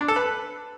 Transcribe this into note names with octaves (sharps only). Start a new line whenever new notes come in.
D4
A4
B4